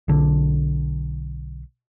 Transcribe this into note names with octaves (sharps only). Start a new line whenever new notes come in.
B1 D3